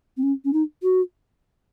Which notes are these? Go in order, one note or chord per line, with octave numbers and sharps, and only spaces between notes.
C4
C#4
C#4
D#4
F#4